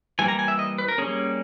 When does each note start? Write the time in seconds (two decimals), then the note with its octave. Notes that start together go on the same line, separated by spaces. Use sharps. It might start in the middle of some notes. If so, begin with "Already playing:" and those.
0.19 E3 G3 A#3 G#5
0.28 A#5
0.39 G#5
0.48 E5
0.59 D#5
0.78 B4
0.88 A#4
0.98 G3 A#3 C#4 G#4